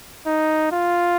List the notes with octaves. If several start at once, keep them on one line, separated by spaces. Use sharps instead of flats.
D#4
F4